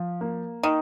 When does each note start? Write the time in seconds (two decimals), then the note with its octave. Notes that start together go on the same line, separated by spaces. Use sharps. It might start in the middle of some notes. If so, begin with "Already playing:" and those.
Already playing: F3
0.21 A#3
0.63 D#3 D#4